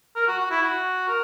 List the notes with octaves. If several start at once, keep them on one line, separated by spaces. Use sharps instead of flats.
A#4
F#4
F#4
E4
F#4
A#4